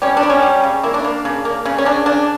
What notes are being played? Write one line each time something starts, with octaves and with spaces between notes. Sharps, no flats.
G3 C#4
D4
G3
C#4
G3
C#3
A#3 E4
D4
A#3
C#3
A#3
C#3
C#4
C#3 D4
C#3 D4